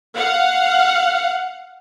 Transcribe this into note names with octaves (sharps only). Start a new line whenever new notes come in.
F5 F#5